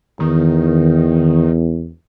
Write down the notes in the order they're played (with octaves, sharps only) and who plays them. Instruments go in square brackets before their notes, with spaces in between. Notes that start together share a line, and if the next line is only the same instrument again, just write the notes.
[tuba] E2 [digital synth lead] D#3